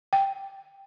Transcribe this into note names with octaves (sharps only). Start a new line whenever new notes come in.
G5